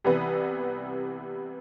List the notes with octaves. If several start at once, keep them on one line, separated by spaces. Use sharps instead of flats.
C2 C3 E3 G3 B3